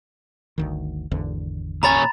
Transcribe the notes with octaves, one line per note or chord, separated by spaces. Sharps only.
G1 D2 D#3
G#1 E2 D3
A#2 C#5 G#5 A#5 B5 A6